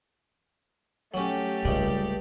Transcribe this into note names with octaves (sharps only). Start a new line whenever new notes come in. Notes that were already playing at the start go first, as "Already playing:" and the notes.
F#3 A3 C#4 G4
C#2 C#3 G3